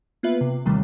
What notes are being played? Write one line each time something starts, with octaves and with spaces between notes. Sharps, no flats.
A#3 B3 F4 B4 E5
C3
D#2 C3 D#3 E3 G3 A3